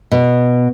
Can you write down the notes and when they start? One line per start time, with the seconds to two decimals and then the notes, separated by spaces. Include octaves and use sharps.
0.12 B2